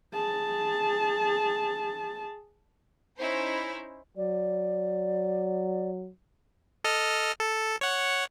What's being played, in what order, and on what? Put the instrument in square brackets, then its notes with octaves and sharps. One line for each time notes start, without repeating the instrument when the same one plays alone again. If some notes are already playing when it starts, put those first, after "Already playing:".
[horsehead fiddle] G#4 A5
[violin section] C#4 D#4 E4 C5
[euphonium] F#3 [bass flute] D5
[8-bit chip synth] A4 D#5 F6
A4
C#5 F#5